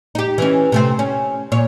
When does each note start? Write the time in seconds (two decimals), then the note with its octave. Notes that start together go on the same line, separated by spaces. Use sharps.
0.15 D#4 G4
0.38 E3 C#4
0.72 C3 A3 C4
0.99 C#4
1.52 A#2 C#5